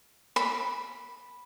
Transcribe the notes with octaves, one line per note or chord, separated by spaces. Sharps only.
B5